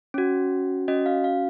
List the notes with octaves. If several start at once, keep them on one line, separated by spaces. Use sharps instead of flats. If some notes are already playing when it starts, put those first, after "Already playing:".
C#4 F#4
C#4 F#4 D#5
F5
F5